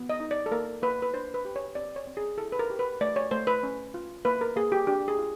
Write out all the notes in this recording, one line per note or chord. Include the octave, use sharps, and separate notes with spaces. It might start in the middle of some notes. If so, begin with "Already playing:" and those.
Already playing: B3
D#5
D#4
D5
A4
A#3 A#4
A#3 B4
B4
D4 C5
B4
G4
C#5
C4 D5
C#5
C4
G#4
E4 A4
B4
A#4
G4
B4
A3 D5
C#5
A3 C5
B4
C#4
F4
A#3 B4
A#4
A#3 G#4
G4
D4 G4
G#4
F4